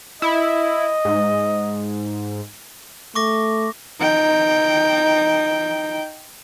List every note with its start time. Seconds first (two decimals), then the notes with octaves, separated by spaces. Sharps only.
0.22 E4 D#5
1.05 G#2
3.15 A3 C#6 D6 A#6
4.00 D#4 G5